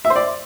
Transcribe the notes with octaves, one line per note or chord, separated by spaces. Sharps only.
E5
C5
D5